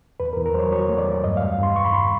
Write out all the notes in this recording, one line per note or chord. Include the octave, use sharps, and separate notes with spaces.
E2 B4
A#4
E2
A#4
F#3 C5 C#5
F#3 C#5
A3
D5
E2
G2 D#5
F5
G2
G2 C6
G2 C#6
B5
G2 C6